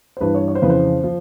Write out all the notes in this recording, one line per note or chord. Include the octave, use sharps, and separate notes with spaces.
C5
G2 E3 B4
C#5
C#5
C5
F2 C#3 E3 B4
C5
F3